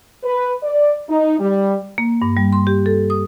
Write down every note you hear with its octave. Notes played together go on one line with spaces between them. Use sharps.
B4
D5
D#4
G3
A#3
G2
G3
C6
G4
A4
D#6